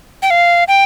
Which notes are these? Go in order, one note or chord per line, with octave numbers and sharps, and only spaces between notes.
G5
F5
G5